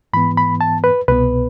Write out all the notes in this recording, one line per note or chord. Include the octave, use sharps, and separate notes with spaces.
G#2 E3 B3 B5
B5
A5
B4
C2 B2 B3 B4